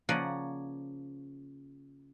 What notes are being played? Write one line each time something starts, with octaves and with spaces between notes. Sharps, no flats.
C#3 F3 A#3 D5 F#5 G#5